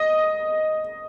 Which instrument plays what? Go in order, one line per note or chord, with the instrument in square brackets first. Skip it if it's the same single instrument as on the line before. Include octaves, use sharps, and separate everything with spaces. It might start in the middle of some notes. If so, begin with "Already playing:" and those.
Already playing: [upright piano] D#5